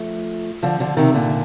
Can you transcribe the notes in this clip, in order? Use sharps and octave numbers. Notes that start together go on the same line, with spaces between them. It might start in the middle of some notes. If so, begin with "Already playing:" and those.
Already playing: F3 A3
D3 F3
D3 F3
C3 D#3
A#2 D3